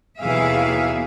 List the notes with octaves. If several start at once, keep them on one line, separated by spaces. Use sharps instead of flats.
D#2 B2 E3 G#4 E5 F5